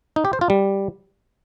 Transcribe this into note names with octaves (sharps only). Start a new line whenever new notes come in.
D#4
G4
C5
F4
G3